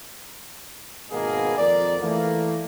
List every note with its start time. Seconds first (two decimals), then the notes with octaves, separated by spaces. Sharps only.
1.11 G#1 B2 A#3 G#4
1.58 F2 A#4 D5
2.02 E3 A3 A#3